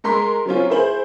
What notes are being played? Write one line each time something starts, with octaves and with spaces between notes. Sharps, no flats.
G#3 A#4 C6 B6
F#3 C4 C#4 F4
E4 G#4 C5 F#7